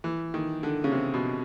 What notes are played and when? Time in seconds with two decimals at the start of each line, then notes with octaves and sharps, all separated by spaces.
0.04 E3
0.34 D#3
0.63 D3
0.84 C#3
0.92 C3
1.14 B2